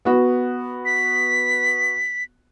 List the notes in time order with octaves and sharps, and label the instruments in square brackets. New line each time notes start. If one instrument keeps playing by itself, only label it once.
[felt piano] B3 F#4
[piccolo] B6